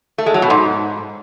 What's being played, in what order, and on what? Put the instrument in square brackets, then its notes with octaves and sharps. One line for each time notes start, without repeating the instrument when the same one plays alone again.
[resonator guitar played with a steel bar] A3
G#3
F#3
B2
G#2